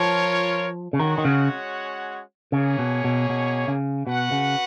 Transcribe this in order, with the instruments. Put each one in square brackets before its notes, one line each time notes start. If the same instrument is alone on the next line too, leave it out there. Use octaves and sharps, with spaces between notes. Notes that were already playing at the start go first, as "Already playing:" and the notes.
Already playing: [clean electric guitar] F3 [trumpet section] F4 A#4 C#5
[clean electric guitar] C#3
[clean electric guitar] D#3 [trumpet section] G#3 C#4 F#4 C#5 F#5
[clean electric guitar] D#3
C#3
[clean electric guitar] C#3 [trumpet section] A#3 C#4 G#4 C#5
[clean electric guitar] B2
B2
B2
C#3
[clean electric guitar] B2 [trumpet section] F#4 B4 F#5
[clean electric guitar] C#3